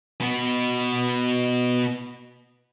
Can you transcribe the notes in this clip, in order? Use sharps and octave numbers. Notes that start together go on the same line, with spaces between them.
B2 B3